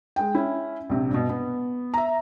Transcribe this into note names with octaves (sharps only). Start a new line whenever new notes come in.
G#3 G5
C#4 E4
A#1 C3
G2 B2
B3
E5 A#5